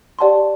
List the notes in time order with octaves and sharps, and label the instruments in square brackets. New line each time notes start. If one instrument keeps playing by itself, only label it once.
[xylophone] G4 D5 F#5 A5 C6